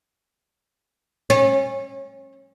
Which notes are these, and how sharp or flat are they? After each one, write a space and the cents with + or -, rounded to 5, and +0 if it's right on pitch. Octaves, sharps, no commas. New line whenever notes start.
C#4 -30